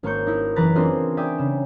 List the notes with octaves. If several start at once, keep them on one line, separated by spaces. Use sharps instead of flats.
G#1 A#3 C#5 C#6 G6
D#4 E4
F#1 E3 B4 A#5 F#6 A6
A#3 C4 D4 F4 G#4 D#5
D5 E5 G5 G#5 D#6
C#3 E7